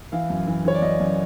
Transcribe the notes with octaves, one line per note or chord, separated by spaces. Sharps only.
E3 F5
F#2
E3
E3 C#5
D5
F#2 D#5
F#2